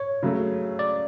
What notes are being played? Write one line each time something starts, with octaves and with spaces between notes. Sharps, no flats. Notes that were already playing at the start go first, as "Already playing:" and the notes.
Already playing: C#5
C#3 F#3 A3
D5